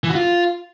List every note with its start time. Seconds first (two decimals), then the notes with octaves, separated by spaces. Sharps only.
0.04 E3
0.09 F#4
0.15 F4